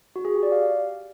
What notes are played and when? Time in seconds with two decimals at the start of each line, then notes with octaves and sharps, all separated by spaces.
0.16 F#4
0.25 G#4
0.34 G4
0.43 D5
0.52 F5